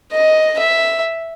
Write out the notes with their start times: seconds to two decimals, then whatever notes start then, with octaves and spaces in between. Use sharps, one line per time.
0.12 D#5
0.58 E5